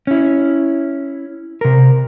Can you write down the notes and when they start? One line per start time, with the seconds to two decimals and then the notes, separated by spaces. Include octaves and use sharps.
0.07 C#4 E4
1.61 C3 A#4